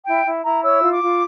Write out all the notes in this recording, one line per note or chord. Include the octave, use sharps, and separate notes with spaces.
E4 G5
E4
E4 A#5
C#5 E6
F4
D6
F4